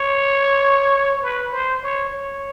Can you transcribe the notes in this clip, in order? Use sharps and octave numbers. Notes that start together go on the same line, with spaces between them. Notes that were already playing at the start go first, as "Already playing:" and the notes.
Already playing: C#5
B4
C5
C#5
C#5